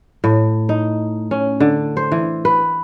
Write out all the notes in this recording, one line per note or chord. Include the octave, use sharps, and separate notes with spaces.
A2
D#4
C#4
D3
C5
E3
B4